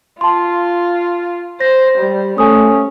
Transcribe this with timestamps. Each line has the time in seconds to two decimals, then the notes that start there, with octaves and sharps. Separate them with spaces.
0.21 F4 A5 C6
1.61 C5 A#6
1.98 G3
2.38 A3 C#4 G#5 D#6